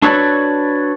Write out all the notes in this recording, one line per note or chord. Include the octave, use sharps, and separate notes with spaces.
D4 F#4 A4 B4 C#5 D5